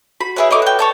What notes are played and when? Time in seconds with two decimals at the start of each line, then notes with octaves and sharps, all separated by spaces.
0.20 F#4 B5
0.36 E4 G#4 B4 C#5 E5 B5
0.51 D#4 A4 B4 C#5 D6
0.62 F#4 G5
0.79 C#5 D5 A5 G6